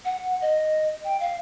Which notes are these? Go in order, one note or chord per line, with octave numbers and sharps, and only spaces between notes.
F#5
D#5
G5
F5